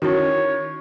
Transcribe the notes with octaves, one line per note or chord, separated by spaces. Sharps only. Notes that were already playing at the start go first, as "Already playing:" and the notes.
D#3 C#4 E4 F#4 C#5